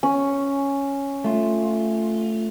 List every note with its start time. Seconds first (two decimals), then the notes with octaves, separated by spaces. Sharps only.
0.03 C#4
1.24 A3 F4